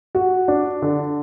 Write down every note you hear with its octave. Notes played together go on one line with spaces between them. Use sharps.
F#4
D4
D3